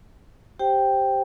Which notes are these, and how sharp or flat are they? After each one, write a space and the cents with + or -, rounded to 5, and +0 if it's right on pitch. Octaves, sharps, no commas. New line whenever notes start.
G4 +0 C5 +5 G5 +0